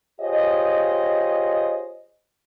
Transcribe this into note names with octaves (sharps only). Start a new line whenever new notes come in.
F4 G4 G#4 C5 C#5 D#5